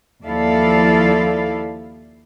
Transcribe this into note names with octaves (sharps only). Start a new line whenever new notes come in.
D#2 F3 E4 A4 D5 F5